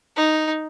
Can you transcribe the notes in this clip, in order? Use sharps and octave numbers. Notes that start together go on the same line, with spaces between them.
D#4